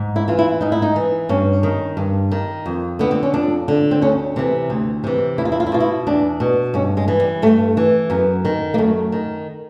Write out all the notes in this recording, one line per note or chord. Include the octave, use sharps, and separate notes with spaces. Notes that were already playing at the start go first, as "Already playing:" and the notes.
Already playing: G#2
E4
E3 F4
E4
G#2 D#4
E4
D#4
E3
G2 C#4
D#3
G2
D#3
F2
D3 B3
C4
C#4
F2 D4
D3
C4
D2 C#4
C3 E3 C4
D2 C4
C3 E3
E2 E4
F4
E4
F4
E4
B2 F4
E4
E2 D4
B2
G2 C#4
G#3
E3
G3
G2 A3
E3
F#2 B3
D#3
A#3
F#2 A3
D#3